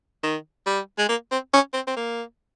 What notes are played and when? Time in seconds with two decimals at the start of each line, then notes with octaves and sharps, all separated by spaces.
0.23 D#3
0.66 G3
0.98 G#3
1.09 A#3
1.31 C4
1.53 C#4
1.74 C4
1.87 C4
1.96 A#3